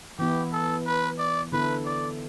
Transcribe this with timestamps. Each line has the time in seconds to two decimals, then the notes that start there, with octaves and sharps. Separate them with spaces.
0.19 E3 B3 E4 G4
0.53 A4
0.86 B4
1.19 D5
1.52 D3 B3 E4 A4 B4
1.85 D5